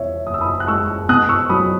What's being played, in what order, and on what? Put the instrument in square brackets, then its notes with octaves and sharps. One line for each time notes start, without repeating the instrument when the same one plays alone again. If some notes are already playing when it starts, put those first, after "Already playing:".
Already playing: [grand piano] E2 B2 C#5 E5
F#1 D#6
E6
B5 D#6
F#6
G#3 C#6 E6
B2 D#6 F#6
C#6 E6
F#3 B5 D#6